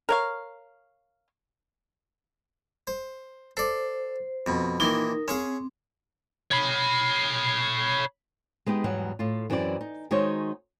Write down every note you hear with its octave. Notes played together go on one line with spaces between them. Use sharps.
A#4 C#5 F5
C5
A4 C5 D5
F2 B2
A#2 D#3 E3 D#4 A#4
C4 C#4 G#4 F5
C#5 B5
G#3 B3 D#4 G4
E2 G#2 F#3 G3 B3 F#5
A2 F4
F#2 E3 C4 E4 F#4 D5
D#4
D#3 G#3 D#4 F#4 C5 C#5